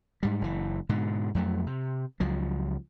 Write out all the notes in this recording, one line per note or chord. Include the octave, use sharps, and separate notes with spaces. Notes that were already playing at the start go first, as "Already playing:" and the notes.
G#2 G3
F#1 E3
G#2 B2 D3
F2 F#3 A3
C3
C#2 F3 F#3